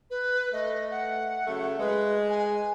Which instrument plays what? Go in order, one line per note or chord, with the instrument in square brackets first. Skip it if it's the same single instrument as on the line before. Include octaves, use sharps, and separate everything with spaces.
[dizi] B4
[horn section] A3 [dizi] D#5
[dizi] F#5
[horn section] C#3 F#3 A3
[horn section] G#3 [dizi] B4
[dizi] G#5